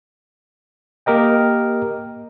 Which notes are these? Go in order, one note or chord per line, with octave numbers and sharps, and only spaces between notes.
A#3 G4 A#4 D#5 G5